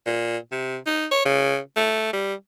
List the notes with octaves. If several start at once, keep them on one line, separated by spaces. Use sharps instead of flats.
A#2
C3
D#4
C#5
C#3
A3
G3